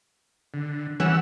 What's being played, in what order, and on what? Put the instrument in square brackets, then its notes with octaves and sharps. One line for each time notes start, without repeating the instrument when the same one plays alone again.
[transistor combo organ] D3
[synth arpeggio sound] E3 C#4 [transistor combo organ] G3 F#5 E6